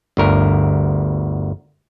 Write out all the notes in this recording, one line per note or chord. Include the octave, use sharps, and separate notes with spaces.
G1 D2 A#4